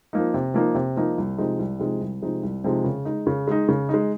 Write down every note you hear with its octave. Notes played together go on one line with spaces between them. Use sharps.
F3 A#3 D#4
C3
F3 A#3 D#4
C3
F3 A#3 D#4
C2
C3 F3 G#3 D#4
C2
C3 F3 G#3 D#4
C2
C3 F3 G#3 D#4
C2
C3 F3 G#3 D#4
C#3
G#3 D#4
C#3
G#3 D#4
C#3
G#3 D#4